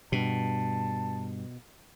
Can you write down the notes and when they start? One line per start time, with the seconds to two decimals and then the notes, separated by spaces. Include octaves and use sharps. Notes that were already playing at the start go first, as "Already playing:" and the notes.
0.12 G2 B2 A5